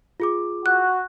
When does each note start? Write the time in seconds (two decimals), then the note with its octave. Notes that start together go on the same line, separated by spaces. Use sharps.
0.20 F4 G#4 D6
0.66 F#4 F#6